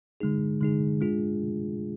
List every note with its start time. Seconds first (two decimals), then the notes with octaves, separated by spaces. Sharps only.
0.20 D3 G#3 D#4 G#4
0.61 D3 G#3 D#4 G#4
1.01 G#3 D4 F4 G#4